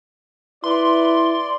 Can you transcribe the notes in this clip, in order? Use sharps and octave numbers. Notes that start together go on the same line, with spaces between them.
E4 B4 D5 C6